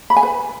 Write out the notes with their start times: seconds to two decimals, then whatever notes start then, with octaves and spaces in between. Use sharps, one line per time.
0.10 B5
0.16 G#5
0.23 B4